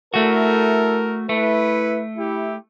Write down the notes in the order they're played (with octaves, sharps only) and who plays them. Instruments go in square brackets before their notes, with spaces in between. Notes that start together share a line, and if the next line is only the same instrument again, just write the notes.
[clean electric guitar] A3 F#4 [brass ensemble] E4 A4 A#4
[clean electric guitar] A3 [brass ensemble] E4 B4
[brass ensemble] E4 G4